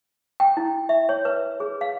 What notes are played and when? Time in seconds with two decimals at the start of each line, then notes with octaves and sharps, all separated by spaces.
0.40 G5
0.57 E4
0.89 E5
1.09 C#5
1.25 B4
1.60 G#4
1.81 F5